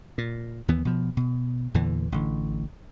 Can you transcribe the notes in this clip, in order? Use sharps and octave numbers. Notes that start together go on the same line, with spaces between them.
A#2
D#2 E3 B3
B2 F3
B2
E2 A#2 D3 E3
A1 D3